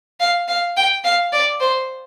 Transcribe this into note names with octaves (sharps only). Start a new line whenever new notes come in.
F5
F5
G5
F5
D5
C5